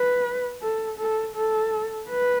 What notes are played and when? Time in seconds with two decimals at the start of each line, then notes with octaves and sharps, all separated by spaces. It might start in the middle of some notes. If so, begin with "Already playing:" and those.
Already playing: B4
0.62 A4
0.98 A4
1.35 A4
2.09 B4